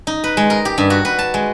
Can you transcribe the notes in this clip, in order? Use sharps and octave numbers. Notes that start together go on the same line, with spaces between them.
D#4
B4
G#3
A#4
G4
G2
F#4
B4
A5
G#3